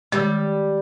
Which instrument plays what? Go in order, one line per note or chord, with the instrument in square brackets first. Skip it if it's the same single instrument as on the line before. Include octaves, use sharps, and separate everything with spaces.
[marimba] D#3 G#3 [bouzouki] G3